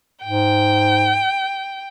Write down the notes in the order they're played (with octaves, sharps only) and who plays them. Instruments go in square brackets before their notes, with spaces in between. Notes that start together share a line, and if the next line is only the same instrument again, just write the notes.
[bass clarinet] G#2 [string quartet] G5